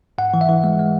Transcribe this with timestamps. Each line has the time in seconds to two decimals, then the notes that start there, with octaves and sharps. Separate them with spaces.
0.18 G#2 F#5
0.34 E3
0.41 E5
0.49 E3
0.64 G#3
0.79 G#3